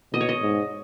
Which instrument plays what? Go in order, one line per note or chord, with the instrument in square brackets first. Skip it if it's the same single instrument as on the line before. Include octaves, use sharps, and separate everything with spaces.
[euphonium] B2 [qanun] D#5
[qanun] C#5
D#5
[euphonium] G#2